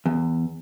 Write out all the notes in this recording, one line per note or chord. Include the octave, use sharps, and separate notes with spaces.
E2